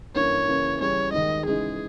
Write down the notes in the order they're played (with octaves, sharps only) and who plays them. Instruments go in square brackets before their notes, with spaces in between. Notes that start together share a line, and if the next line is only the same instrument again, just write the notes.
[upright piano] G2 E3 A#3 C#4 [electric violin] C#5
[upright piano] C#3 E3 A#3 C#4
[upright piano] C#3 E3 G3 C#4 G#4 [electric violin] C#5
[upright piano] D#2 D#3 G#3 [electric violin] D#5
[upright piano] C#3 E3 G#3 D#4 [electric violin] G#4